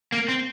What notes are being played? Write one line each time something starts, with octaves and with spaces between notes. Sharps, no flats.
A#3
C4